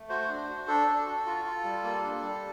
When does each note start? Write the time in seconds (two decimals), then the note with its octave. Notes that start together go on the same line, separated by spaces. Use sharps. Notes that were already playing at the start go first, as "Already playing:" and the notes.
Already playing: A3
0.09 F#4 C5
0.28 D4
0.48 F#4
0.68 D4 A4
0.87 D4
1.05 F#4
1.26 F4
1.45 F4
1.63 G3
1.84 A#3
2.03 D4
2.21 G3